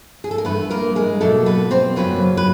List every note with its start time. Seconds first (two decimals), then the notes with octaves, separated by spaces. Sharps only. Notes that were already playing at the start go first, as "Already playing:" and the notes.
0.24 G#4
0.31 A4
0.38 A#4
0.45 G2 E3 A3 B3 B4
0.70 A#3 A#4
0.95 G#3 G#4
1.21 B2 F#3 A3 A#3 A4
1.46 B3 B4
1.71 C4 C5
1.96 F#2 C#3 F#3 A#3 B3 B4
2.37 B4